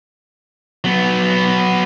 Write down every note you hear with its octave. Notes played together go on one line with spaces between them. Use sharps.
F#3 B3